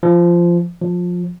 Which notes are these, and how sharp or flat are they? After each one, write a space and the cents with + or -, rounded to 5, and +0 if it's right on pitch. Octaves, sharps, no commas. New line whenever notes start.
F3 -15
F3 +20